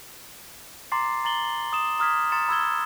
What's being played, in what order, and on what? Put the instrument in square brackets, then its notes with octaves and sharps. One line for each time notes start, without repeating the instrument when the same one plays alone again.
[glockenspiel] A#5 C6 D6 A6 C7
A#5 A6 F#7 G7
D#6 E7
A#5 D#6 F6 G#6 B6 E7
A#5 C6 A6 C#7 E7
B5 E6 G#6 G7